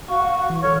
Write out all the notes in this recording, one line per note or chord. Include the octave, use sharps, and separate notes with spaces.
F#4 F5 C#6
E3
A4 C#5 F6